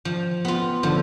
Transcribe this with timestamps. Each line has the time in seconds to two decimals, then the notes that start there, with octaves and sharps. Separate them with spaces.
0.05 F3
0.45 B3 F4
0.83 D3 F3